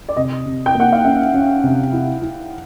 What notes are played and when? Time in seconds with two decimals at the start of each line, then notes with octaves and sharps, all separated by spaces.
0.09 D5
0.16 C3 D#5
0.46 C3
0.66 G5
0.75 A#3 F#5
0.92 F5
1.04 C#4 E5
1.34 C#4
1.64 C3
1.93 E4
2.22 E4